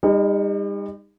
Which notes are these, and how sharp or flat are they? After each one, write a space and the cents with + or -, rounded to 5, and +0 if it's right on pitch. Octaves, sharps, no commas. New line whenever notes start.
G3 +40 D#4 +0